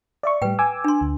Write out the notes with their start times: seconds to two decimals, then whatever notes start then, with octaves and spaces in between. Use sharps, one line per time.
0.23 D5 E5 C#6
0.42 A2 G3 B4 G5
0.59 G#5 D6 E6
0.84 D4 C6
1.01 D2